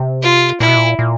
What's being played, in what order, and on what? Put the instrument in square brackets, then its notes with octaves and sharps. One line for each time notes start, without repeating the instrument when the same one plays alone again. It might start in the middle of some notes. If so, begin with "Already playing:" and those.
Already playing: [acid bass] C3
[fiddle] F4
[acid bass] A#2 [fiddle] E4
[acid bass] B2
A#2
A#2